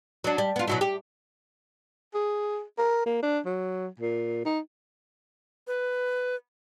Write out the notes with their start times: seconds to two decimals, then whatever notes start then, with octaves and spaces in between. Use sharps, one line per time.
0.24 F#3 D4
0.38 G3
0.56 B3 F4
0.68 B2 F#3 E4
0.81 G4
2.14 G#4
2.78 A#4
3.06 A#3
3.23 D4
3.46 F#3
4.00 A#2
4.45 D#4
5.67 B4